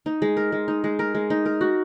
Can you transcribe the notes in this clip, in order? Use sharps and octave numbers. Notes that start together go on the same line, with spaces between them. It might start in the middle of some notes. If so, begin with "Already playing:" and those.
D#4
G#3
A#4
G#3
D#4
G#3
A#4
G#3
D#4
A#4
F#4